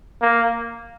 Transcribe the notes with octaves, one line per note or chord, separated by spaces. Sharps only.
A#3